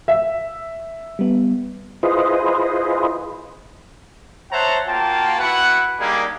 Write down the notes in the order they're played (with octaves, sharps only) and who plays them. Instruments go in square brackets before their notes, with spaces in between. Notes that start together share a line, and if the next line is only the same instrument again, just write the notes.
[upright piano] E5
[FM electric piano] G3 B3
[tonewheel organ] E4 F4 G#4 B4 C5 D#5
[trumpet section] C5 C#5 E5 F#5 A5 A#5
A#3 F4 F#4 G5 A5
E4 F#4 B4 F#5
G3 A#3 D4 D#4 G4 G#4